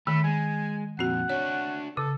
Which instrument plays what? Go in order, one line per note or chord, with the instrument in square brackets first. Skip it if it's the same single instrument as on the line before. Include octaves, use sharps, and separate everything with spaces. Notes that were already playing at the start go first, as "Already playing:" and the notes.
[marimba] D#3 [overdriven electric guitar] A3 [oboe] B5
[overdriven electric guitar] G#3 [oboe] G#5
[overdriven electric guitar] F2 A#2 [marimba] C4 F#4 [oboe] F#5
[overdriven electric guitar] D4 F#4 [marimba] C#5
[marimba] C#3 [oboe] A4